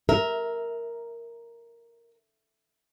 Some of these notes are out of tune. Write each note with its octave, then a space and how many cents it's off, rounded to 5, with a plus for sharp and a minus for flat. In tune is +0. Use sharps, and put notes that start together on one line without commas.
A#4 +0 E5 -20